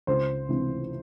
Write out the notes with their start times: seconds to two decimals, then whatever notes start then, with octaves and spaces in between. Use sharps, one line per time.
0.07 C#2 C5
0.49 C3 E3